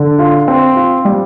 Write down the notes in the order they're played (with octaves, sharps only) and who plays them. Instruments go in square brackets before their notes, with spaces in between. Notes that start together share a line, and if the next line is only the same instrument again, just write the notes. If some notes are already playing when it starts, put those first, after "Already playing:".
Already playing: [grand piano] D3
F4
C4
F4
G3